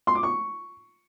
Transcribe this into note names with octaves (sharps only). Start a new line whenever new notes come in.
C6
D6
C#6